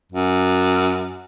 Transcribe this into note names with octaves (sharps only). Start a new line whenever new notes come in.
F#2